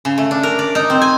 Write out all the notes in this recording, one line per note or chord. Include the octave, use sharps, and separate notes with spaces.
C#3
A3
D4
A#4
D5
D#4
C4
G#5